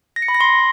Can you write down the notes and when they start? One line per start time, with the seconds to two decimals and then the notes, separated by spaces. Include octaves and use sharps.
0.16 A#6
0.22 C#7
0.28 B5
0.34 A#6
0.41 C6